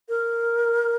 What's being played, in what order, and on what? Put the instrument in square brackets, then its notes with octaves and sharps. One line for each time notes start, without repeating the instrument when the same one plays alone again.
[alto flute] A#4